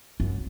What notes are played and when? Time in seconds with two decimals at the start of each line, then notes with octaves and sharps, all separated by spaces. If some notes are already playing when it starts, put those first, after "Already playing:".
0.20 F#2